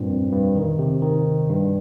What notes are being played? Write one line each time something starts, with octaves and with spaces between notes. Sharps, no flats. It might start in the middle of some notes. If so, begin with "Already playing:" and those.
Already playing: G2 A#2 C4
F2
G2
D#3
C3
D#3
G2